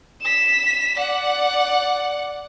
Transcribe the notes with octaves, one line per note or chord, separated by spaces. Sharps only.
B6 E7
D5 F#5